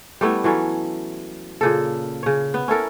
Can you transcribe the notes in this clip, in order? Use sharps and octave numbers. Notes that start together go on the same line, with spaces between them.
G3 A3 B3 E4
E3 F#3 C#4 A4
A#2 C#3 A4
C#3 C#5
B3
C#4 E4 A4 A#4